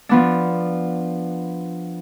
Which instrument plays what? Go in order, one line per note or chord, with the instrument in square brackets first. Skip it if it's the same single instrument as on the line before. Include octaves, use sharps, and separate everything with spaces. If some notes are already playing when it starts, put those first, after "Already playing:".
[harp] F3 B3 D4